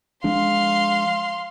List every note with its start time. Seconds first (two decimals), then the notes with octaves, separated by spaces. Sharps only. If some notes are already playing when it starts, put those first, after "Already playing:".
0.24 F3 G#3 D4 F5 C6